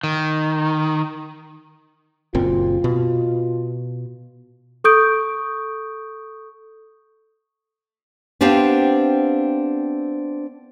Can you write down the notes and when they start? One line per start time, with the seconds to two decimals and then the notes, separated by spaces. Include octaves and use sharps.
0.03 D#3
2.35 F#1 A#2 C4 F4
2.84 B2
4.84 A4 C#6 D#6 G6 D7
8.41 B3 C4 D4 G4 C5 F5